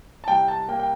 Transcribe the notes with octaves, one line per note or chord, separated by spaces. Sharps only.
A5
C2 G5
A5
A#3 G5
G5